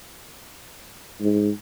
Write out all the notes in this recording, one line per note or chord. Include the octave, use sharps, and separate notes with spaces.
G#2